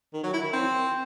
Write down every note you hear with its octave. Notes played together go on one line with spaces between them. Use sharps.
D#3
F#3
E4
D#3
C4